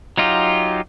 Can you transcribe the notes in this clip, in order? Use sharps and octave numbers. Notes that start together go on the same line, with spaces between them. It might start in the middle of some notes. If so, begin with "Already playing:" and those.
F#3 D#4 F4 G4